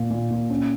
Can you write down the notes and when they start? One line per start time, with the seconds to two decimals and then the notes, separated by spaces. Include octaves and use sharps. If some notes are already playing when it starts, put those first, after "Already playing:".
Already playing: A#2 A#3
0.10 A#2
0.31 A#2
0.50 C#4